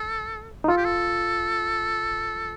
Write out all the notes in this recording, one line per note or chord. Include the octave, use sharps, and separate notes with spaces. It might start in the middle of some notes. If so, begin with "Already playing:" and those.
Already playing: A4
D#4
F4 A4
G4
A4